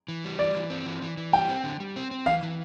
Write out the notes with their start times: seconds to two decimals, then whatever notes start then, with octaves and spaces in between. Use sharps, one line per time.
0.08 E3
0.24 G3
0.39 E3 D5
0.55 E3
0.70 C4
0.86 E3
1.02 E3
1.17 E3
1.33 G3 G5
1.49 C4
1.64 D3
1.80 G3
1.96 C4
2.11 C4
2.26 E3 F5
2.43 E3